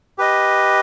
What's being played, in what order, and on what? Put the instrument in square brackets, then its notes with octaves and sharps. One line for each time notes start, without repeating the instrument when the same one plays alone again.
[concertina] G4 B4 D#5